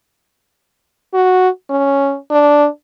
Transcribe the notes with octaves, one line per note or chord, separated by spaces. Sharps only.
F#4
C#4
D4